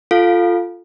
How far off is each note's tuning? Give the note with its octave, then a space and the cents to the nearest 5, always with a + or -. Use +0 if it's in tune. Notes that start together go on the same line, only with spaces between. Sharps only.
F4 +0 A4 +0 F5 +15